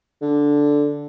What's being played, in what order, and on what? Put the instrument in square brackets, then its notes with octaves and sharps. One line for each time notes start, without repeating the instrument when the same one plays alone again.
[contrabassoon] D3